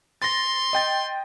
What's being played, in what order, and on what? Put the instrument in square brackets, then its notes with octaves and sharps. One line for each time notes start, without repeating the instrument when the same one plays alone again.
[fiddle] C6 [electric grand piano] A6 A#6
[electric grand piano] D#5 G5 A6